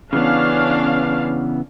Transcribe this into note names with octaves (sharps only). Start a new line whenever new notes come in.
C#3 E3 B3 C#4 D4 F5